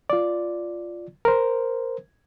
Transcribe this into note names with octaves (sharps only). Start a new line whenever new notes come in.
F4 D5
A#4 C5